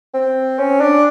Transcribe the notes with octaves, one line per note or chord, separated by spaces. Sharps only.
C4
C#4
D4